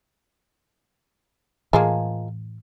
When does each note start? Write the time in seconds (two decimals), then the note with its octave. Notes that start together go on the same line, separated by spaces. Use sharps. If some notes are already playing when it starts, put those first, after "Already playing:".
1.73 A2 E3 F3 G#3 A#3